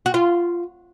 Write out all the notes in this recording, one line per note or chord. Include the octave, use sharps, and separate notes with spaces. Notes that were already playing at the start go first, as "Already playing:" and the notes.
F#4
F4